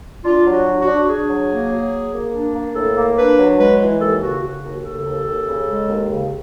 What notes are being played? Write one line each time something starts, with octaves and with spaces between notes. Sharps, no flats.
D4 F4
F#3
F#4
D4
F#4
D4
D4 G#4
F#3
A#3
F#3
A#3
A#3
D4
A#3
A2 A4
A#3
D4 B4
F#3
G#3 B4
E3
D#2 A4
C#3 F#4
C#3 F#4
D#2
C#3 A4
D#2
D#2
C#3
G#3
D#2
C#3